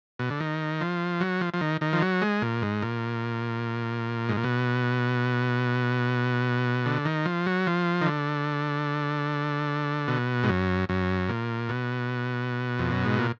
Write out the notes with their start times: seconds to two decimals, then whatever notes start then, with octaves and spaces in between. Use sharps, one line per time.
0.19 B2
0.30 D3
0.40 D#3
0.81 F3
1.21 F#3
1.41 F3
1.54 F3
1.61 D#3
1.81 D#3
1.93 F3
2.02 F#3
2.22 G#3
2.42 A#2
2.62 G#2
2.82 A#2
4.29 G#2
4.37 A#2
4.44 B2
6.86 D3
7.05 D#3
7.25 F3
7.46 F#3
7.67 F3
8.01 D#3
8.06 D3
10.08 B2
10.43 G#2
10.49 F#2
10.89 F#2
11.29 A#2
11.69 B2
12.79 F2
12.92 F#2
13.05 G#2
13.19 A#2